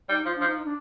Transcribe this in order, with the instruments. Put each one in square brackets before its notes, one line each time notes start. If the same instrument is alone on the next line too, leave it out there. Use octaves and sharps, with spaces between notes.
[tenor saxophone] G3 [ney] D#4
[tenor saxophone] F3 [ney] F4
[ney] D4
[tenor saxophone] F3
[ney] D#4
D#4
D4